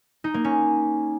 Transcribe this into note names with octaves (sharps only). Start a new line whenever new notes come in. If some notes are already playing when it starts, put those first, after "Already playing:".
D#4
A#3
C#4